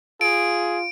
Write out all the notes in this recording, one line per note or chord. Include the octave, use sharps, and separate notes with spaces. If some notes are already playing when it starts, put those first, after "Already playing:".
F4 G#4 D7